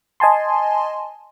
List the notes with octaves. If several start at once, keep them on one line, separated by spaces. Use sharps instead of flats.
D#5 G#5 A5 C6